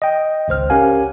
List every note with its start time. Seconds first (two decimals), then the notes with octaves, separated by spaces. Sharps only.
0.02 D#5 G5
0.48 G#1 C#2 C5 F6
0.70 C#4 G4 A#4 F5 F#5 G#5